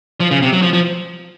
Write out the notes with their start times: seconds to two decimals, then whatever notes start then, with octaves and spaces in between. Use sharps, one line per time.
0.20 F3
0.31 C#3
0.42 C3
0.52 F#3
0.62 F3
0.73 F3